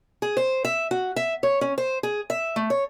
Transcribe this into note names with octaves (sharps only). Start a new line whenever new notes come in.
G#4
C5
E5
F#4
E5
C#5
C#4
C5
G#4
E5
A3
C#5